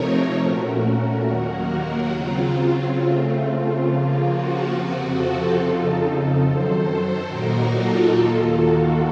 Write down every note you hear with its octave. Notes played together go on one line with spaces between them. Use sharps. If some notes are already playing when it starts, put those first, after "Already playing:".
Already playing: C3 F3 A3 C4 D#4 A#4 C#5
A#2 A3 C#4 F#4 A#4
D#2 D#3 F#3 A#3
F#4
C#3 F#3 C4 F4
C#3 A3 C4
C#3 F3 A#3 F4
F#4
F2 C3 F3 C4
F4 A4
F2 C#3 F3 C4 D#4
F#2 D#3 F#3 A4 C5
A#2 F#3 A#3 D#4 F#4 A#4
F4 A4
D#2 D#3 A#3
F#4